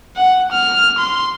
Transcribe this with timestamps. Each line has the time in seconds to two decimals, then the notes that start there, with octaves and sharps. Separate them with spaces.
0.17 F#5
0.52 F6
0.98 C6